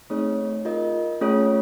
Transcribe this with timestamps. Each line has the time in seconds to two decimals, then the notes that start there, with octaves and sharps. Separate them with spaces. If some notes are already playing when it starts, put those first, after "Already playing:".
0.10 A3 C4 D#4 G#4 C#5
0.65 F4 A#4 D#5
1.21 A3 C#4 F4 G#4 C#5